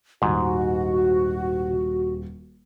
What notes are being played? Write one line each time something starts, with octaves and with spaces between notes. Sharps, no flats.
D#1 G#2 F#4